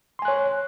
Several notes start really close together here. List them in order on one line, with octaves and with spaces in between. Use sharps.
C6 G#5 F#6 C#5